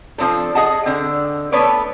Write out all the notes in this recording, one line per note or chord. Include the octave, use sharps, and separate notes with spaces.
F3 F#3 C4 D4 A4
G#4 D#5 F#5 A5
D3 C4
A3 B3 A4 B4 C#5 D5